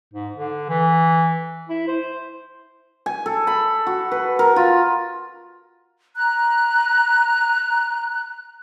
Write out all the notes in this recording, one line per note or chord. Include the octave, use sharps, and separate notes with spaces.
G#2
D3
E3
E4
C5
G#5
A4
B5
F#4
B4
A#4
F4
A#5 F#6